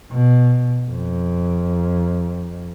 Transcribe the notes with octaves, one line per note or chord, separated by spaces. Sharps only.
B2
F2